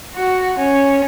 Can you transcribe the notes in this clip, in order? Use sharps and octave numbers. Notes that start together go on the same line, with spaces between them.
F#4
C#4